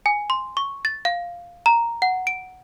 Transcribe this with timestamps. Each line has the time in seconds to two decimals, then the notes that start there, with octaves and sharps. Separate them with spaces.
0.06 G#5
0.30 C6
0.57 C#6
0.85 A6
1.05 F5
1.66 A#5
2.02 F#5
2.27 D7